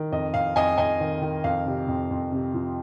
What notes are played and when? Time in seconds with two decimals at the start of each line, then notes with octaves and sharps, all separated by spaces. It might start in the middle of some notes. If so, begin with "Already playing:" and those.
Already playing: D#3
0.12 F2 D#5
0.34 F2 F5
0.56 F2 D#5 G#5
0.78 F2 D#5 G#5
1.00 D#3
1.22 D#3
1.44 F2 F5
1.66 C3
1.88 F2
2.11 F2
2.32 C3
2.54 F3